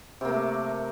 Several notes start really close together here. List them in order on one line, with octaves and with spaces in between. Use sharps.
C3 A#3 A3